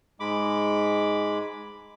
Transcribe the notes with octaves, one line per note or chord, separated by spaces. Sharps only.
G#2 G#3 B5 D6